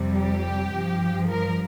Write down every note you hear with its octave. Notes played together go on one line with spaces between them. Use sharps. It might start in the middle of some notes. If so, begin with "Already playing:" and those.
Already playing: F2 C3 G3
G4
G2 F3
A#4